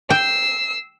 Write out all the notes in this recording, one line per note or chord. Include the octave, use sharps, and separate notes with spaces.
G5 E6 C7